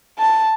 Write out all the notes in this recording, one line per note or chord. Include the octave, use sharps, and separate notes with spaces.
A5